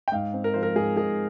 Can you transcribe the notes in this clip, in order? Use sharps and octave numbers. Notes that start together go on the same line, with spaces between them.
G5
G#2 F5
C4
A#4
F3 C5
A#4
G#2 G#4
G#2 G#4